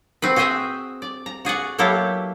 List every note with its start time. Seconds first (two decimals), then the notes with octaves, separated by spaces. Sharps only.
0.22 C4 F#4 B4
0.36 F#4 G#4 C5 D#5 E5 G5
1.02 D5
1.26 A#5
1.45 F#4 G#4 D5 F#5
1.78 F#3 A#3 B3 E4 G4 A4